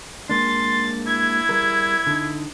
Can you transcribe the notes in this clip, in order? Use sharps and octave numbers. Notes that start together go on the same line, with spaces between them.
G#3 A#3 D4 C6 A6
E4 G#6
G3 G#4 A#4
D3 D#4